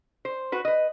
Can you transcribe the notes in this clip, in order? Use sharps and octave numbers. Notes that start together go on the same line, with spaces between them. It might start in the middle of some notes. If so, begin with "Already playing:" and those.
C5
F#4 B4
B4 D#5